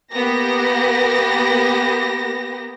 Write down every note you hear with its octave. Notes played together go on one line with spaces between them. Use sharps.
A#3 B3 G4 A#6